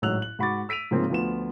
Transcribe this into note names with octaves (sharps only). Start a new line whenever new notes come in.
A1 G#2 F#3 E6 F#6 F7
F#7
G#2 F#4 B5 C#6 D6 A6
E6 B6 D7 D#7 F7
G#2 C#3 F3 G#3 A#3 C4
D2 F3 B3 F4 E7